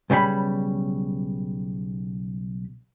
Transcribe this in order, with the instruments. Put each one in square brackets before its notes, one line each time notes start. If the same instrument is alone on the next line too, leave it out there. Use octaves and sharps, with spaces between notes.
[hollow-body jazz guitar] B1 C#3 G3 G#4 B5